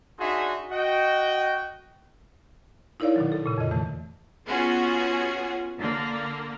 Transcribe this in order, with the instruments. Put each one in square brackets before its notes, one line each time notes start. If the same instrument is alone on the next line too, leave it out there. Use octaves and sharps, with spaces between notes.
[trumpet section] D4 D#4 F#4 G#4 E5 C6
F#4 D#5 G5
[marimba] D#4 E4 A#4 C#5 D5 F5
B2 D#3 F#3
A4
A#2 C#3
F2 D3 D#5
C3 E3 A3
[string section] B3 C#4 F4 F#4 G#4
D3 A#3